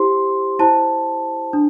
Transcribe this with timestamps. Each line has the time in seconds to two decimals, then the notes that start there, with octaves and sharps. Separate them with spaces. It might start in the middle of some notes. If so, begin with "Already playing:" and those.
Already playing: E4 G4 C5 C6
0.59 E4 C5 A5
1.53 D4